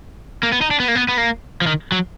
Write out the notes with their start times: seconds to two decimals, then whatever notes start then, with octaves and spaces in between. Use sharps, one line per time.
0.43 A#3
0.52 B3
0.61 D#4
0.71 D4
0.80 B3
0.88 A#3
0.95 B3
1.08 B3
1.17 A#3
1.62 F3
1.67 D#3
1.92 F#3